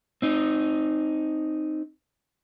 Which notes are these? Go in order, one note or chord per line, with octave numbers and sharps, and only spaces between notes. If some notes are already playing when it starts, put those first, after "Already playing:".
C4 D#4